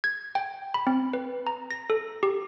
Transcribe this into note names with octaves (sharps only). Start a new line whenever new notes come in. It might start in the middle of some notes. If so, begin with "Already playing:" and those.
G#6
G5
B5
C4
B4
A#5
A#6
A4
G4